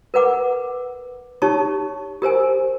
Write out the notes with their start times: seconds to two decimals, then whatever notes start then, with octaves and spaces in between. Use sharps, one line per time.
0.14 A#4 B4 F#5 D6
1.42 D#4 G4 C#5 A5 C#6
2.22 G4 A#4 C5 G#5